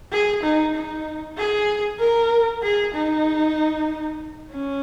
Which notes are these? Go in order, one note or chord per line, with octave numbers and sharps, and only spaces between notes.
G#4
D#4
D#4
G#4
A#4
G#4
D#4
C#4